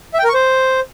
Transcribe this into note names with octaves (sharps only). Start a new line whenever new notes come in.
E5
G5
A#4
C#6
C5